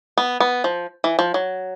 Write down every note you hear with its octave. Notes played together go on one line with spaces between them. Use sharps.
B3
B3
F3
E3
F3
F#3